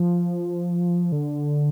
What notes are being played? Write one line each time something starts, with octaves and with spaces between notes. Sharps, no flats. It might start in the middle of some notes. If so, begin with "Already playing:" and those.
Already playing: F3
D3